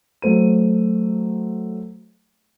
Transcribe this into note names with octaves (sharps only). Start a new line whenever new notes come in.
F#3 A3 C5 D#7